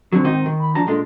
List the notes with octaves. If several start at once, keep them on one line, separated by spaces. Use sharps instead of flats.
D3 F#3 C4
G#2 D#3 D#4
D#3
B5
F2 D4 A5 A#5
A#2 G#3 D4 A4